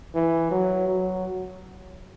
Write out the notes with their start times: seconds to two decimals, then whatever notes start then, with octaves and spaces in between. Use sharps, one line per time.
0.15 E3
0.51 F#3
0.88 F#3